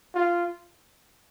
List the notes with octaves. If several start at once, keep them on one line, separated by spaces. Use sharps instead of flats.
F4